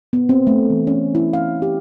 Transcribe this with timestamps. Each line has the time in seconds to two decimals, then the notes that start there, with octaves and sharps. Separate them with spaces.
0.13 B3
0.29 C4
0.47 A3
0.70 E3
0.87 C#4
1.15 E4
1.33 F5
1.62 G4